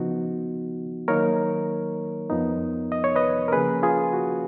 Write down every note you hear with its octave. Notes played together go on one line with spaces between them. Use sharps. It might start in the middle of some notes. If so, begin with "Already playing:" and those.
Already playing: C#3 F3 B3 D#4 F#4
D#3 F#3 A#3 D#4 A#4 C#5
F2 F3 B3 D#4
D#5
C#5
B4 D#5
A#4
C#3 F3 A#3 C#4 G#4 B4
F4 G#4
F#4